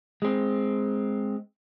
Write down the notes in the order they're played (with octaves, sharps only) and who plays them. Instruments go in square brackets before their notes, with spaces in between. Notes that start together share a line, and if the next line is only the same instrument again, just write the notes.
[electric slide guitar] G#3 C4